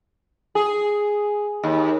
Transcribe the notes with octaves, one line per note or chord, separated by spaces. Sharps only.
G#4
D#2